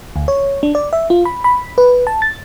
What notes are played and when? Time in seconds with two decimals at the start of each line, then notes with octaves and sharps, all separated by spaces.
0.16 D2
0.28 C#5
0.63 D4
0.75 D5
0.93 E5
1.10 F4
1.25 B5
1.44 B5
1.78 B4
2.07 A5
2.22 A6